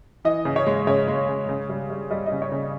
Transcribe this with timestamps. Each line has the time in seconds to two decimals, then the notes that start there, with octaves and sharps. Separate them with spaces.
0.25 E3 D#5
0.45 C#3
0.56 C#5
0.66 G#3
0.87 C#3 C#5
1.08 G#3
1.29 C#3
1.49 C#3
1.69 G3
1.90 G3
2.10 G3 D#5
2.26 D#5
2.32 C#3
2.42 C#5
2.52 C#3